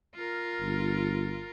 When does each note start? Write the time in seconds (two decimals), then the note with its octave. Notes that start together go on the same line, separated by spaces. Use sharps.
0.16 F4 A#4
0.61 G1